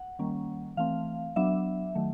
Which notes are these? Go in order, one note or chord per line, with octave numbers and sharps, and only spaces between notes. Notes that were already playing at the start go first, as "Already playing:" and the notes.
Already playing: F#5
D#3 G3 A#3 C#4
E3 A3 C4 F5
F#3 B3 D4 E5
D#3 F#3 A3